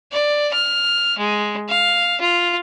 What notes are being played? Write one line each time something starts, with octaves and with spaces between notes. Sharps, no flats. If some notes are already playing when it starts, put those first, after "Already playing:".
D5
F6
G#3
F5
F4